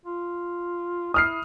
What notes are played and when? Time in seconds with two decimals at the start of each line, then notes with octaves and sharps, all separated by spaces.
0.06 F4
1.14 E4 D#6 F6 C7